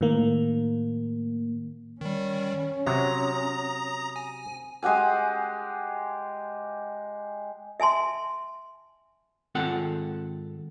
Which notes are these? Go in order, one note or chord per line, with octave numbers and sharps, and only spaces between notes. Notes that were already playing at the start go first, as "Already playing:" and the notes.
A2 D#3 A#3
D#3 G3 C#4
C3 F#3 A#5 D#6 A#6
G#5
G#3 G4 F#5 G#5
E5 G#5 A5 C6
G#2 D#3 C4 F4 A4 F#5